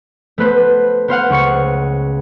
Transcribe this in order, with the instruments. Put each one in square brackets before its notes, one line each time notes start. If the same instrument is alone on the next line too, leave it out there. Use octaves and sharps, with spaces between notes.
[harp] A3 B3 B4 C5
B3 C5 F5 F#5
C#2 C#6 C#7